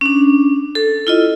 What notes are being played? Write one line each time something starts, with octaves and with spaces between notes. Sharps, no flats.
C#4 D4
A4
E4 F4 D#5